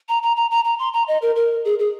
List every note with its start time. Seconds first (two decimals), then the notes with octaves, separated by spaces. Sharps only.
0.09 A#5
0.23 A#5
0.36 A#5
0.51 A#5
0.65 A#5
0.79 C6
0.93 A#5
1.08 D#5
1.22 A#4
1.36 A#4
1.65 G#4
1.79 G#4